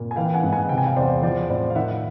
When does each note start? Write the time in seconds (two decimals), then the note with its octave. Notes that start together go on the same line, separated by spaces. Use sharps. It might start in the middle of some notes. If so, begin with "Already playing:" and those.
Already playing: A#2
0.11 G#5
0.16 E3 F5 G5
0.34 F#5 G#5
0.43 G#2
0.53 F#5 G#5
0.69 C3 G5
0.78 G#5
0.86 F5 G5
0.96 E2 C5 D5
1.22 F3 C5 D5
1.49 A2 C5 D5
1.70 F5
1.76 D#3 E5 F#5